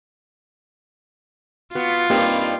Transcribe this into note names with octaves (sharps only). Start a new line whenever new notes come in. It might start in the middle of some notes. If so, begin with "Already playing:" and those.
B3 F4 F#4
G2 A#3 C4 D#4 G4